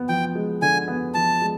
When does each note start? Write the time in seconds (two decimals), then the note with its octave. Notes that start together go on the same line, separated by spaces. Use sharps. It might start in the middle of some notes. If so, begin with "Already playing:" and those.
Already playing: B3
0.09 F3 G5
0.35 G#3
0.62 D3 G#5
0.88 B3
1.14 F3 A5
1.42 G#3